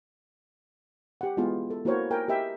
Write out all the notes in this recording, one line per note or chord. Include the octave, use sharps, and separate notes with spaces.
G4 F#5
G#3 B3 E4 F4 G#4
A4
A#3 E4 F#4 A#4 C5 C#5
A#4 G5 G#5
G4 A#4 D#5 E5 G5